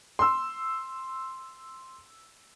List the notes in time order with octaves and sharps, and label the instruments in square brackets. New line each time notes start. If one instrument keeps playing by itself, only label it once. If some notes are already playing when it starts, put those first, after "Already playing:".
[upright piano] C6 E6